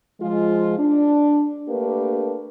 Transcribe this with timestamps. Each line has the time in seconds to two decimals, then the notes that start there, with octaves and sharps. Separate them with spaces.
0.21 F3 G#3 F4
0.79 D4
1.68 A3 A#3 D4 G4 A#4 B4